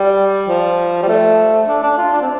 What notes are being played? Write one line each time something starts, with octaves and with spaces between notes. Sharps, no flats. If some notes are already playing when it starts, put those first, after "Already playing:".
Already playing: G3
F3
G3
A3
D4
D4
F4
D4
C4